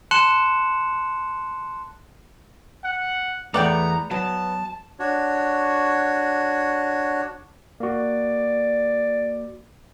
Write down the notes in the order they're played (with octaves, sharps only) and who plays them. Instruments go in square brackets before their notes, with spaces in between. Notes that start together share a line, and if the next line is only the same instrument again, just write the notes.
[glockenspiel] A5 C6 F#6 C#7 E7 F#7
[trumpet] F#5
[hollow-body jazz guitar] E2 A3 [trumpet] B3 [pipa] D5 F#5 G5 [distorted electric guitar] A#5
[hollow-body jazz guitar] F#3 [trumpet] B3 [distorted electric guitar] A5
[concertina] D4 F#4 C#5
[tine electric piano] A#3 F#4 [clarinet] D5